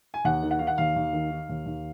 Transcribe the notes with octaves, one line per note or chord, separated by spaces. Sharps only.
G#5
D#2 F#5
D#3
F#5
D#3 F5
F#5
D#2 F5
D#2
D#3
D#3
D#2
D#2